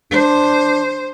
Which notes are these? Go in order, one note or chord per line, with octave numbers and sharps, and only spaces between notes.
D4 C5